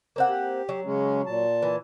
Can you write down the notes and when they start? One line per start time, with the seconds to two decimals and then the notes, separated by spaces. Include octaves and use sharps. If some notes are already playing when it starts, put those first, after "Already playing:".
0.16 A#3 C4 F#5
0.29 G4
0.69 F#3
0.85 C#3 G#3 C#4
1.26 A#2 A5
1.62 E3